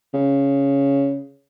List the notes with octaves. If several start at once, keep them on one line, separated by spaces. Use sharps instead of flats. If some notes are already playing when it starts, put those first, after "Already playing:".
C#3